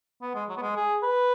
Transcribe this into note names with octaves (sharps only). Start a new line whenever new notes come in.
B3
G#3
F#3
B3
G#3
G#4
B4